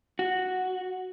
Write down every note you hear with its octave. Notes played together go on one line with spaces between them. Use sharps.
F#4